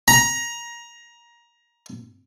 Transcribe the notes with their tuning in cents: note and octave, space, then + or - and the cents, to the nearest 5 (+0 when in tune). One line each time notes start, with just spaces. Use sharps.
A#5 +20